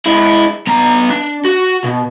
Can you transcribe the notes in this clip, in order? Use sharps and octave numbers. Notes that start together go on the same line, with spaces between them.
G#3 E4
B3 A#5
D4
F#4
B2